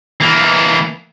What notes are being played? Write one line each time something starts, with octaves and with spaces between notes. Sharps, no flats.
E3 A#3